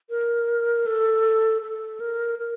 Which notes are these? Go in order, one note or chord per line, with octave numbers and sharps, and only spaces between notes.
A#4
A4
A4
A#4
A#4